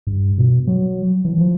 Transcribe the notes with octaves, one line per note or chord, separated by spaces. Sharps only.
G2
B2
F#3
E3
F3